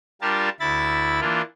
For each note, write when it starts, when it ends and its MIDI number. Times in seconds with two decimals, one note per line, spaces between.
0.22 0.49 55
0.22 0.49 62
0.22 0.49 65
0.22 0.49 67
0.22 0.49 70
0.22 0.49 81
0.60 1.20 38
0.60 1.20 64
0.60 1.20 83
0.60 1.20 93
1.21 1.42 52
1.21 1.42 58
1.21 1.42 62
1.21 1.42 65